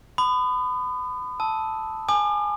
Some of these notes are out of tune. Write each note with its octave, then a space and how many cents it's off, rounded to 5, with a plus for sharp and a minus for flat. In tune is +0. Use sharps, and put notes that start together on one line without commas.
B5 +30 D#6 -30
A5 +0 E6 -25
G#5 +0 D6 +45